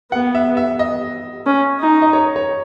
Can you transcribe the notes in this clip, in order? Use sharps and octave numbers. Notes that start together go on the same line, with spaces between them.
B3 F#5
E5
E5
D#5
C#4
D#4
D#5
C#5
C#5